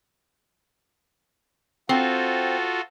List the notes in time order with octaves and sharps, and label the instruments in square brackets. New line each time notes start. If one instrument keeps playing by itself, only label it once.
[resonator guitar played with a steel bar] C4 [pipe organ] F4 F#4 A4